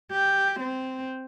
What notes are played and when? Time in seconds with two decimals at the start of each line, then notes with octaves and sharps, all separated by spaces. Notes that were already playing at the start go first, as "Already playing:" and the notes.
0.12 G4
0.60 C4